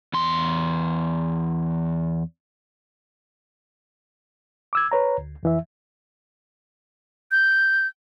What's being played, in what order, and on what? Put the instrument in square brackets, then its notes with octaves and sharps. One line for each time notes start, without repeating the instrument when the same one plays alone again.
[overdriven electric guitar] E2 C6
[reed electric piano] D6 E6 G#6
B4 C#5 A#5
D2
F2 E3 E5
[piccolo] G6